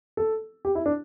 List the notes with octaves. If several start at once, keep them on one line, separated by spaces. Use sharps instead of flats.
A4
G4
E4
D4